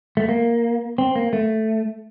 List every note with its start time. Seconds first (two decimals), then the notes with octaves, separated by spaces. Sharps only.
0.17 A3
0.29 A#3
0.98 C4
1.16 A#3
1.33 A3